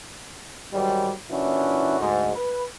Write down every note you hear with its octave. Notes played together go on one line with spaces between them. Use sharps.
G#2 D#3 F#3 G3
A#2 E3 C#4 D4 E4 F#4
D2 G#2
B4